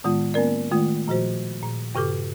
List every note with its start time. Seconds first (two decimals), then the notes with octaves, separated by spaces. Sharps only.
0.04 A2 D#3 G#3 B3 F4
0.34 A#3 B3 C#4 A#4 D5
0.71 D#3 G#3 A3 F4
1.08 A#2 F3 F#4 C5
1.63 A#2
1.95 G2 C#3 G4 A4 D6